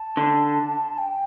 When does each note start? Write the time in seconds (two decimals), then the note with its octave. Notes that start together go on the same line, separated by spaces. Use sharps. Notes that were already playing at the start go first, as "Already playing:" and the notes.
Already playing: A5
0.17 D3
0.98 G5